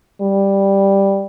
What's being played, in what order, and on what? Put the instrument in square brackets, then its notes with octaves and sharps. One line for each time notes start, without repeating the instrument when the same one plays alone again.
[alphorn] G3